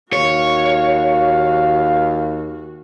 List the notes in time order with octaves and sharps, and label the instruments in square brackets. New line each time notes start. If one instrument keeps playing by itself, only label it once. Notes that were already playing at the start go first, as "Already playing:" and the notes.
[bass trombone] D#2 [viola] F#4 [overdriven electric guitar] C#5 [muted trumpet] F5